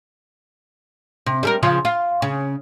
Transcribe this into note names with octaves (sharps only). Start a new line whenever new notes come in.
C3
G3 A4 A#4
C#3 F3 F4
F4
C#3